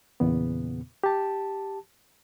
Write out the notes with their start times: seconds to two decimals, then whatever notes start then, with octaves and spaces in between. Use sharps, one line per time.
0.20 E2 A#2 C#3 B3
1.04 G4 A5